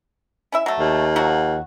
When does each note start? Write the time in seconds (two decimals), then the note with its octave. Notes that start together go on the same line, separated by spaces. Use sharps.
0.52 C#4 E4 E5
0.66 F#3 A3
0.79 D#2
1.16 F3 F#3 F#4